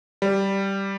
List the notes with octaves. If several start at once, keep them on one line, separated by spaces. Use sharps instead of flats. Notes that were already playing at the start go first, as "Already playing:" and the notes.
G3